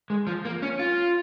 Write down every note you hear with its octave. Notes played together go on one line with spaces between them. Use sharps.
G#3
F3
A#3
C#4
F4